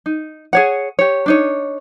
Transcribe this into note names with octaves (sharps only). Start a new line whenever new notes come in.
D#4
G#4 C#5 F#5
G4 C#5
D4 D#4 C#5